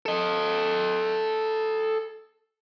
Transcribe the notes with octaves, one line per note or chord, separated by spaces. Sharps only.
A4 D#5